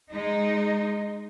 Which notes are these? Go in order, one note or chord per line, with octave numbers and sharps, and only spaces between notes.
G#3 D#4